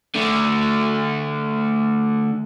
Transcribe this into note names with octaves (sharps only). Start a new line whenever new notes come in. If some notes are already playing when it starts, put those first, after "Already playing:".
D3 A3